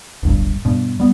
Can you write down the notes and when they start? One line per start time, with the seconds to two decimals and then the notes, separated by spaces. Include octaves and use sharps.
0.23 D1 G1 G2
0.65 G2 B2
1.00 G3 B3